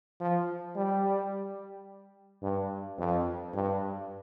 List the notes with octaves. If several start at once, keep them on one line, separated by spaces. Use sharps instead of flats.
F3
G3
G2
F2
G2